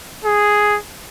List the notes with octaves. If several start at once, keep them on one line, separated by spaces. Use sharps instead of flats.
G#4